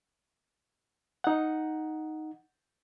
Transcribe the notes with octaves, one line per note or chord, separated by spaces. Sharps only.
D#4 F#5